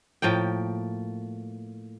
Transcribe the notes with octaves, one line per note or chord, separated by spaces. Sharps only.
A2 F3 A#3 G5